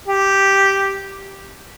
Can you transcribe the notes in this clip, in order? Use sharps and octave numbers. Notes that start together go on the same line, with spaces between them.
G4